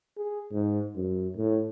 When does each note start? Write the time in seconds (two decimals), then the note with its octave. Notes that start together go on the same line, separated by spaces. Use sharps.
0.17 G#4
0.52 G#2
0.96 F#2
1.37 A2